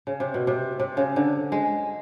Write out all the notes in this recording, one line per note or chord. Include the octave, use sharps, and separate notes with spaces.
C#3
C3
B2
C3
C3
C#3
D3
G#3